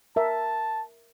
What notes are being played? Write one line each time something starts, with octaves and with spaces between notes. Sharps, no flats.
A#4 E5 A5